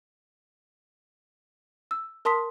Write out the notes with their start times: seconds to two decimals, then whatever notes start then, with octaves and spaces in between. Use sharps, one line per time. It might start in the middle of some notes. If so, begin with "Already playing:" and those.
1.91 E6
2.25 A#4 A5 C6 D#6 B6